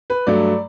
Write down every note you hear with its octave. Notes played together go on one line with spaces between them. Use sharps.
B4
G2 F#3 A3 D5